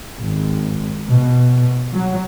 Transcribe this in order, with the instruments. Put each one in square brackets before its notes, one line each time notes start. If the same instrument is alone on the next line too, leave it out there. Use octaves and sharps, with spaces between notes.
[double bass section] G#1
B2
F#3